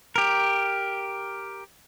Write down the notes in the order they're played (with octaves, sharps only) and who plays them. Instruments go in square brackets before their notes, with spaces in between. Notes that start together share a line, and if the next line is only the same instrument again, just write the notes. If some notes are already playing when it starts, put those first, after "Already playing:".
[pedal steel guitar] G4 A#4